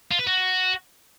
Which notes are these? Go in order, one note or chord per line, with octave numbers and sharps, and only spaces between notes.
F4
B4
F#4